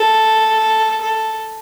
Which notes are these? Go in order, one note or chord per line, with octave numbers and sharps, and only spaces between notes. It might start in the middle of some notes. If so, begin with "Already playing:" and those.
Already playing: A4
A4